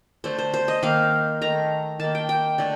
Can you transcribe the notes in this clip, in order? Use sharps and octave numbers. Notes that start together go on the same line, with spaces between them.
D3 A3 C5
C5
C5
D#5
D#3 A#3 F5
D#3 A3 A#5
D#3 A#3 A5
G5
G5
D3 A3